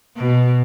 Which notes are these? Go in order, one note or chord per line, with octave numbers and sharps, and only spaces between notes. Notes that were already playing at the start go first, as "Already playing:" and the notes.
B2